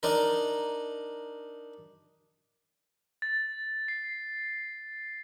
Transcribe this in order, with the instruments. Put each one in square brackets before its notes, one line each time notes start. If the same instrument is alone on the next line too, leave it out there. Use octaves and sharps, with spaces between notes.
[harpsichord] D4 D#4 A#4
[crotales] A6
C7